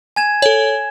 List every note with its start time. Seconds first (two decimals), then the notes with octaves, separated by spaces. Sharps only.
0.16 G#5 G#6 E7
0.42 A4 C#5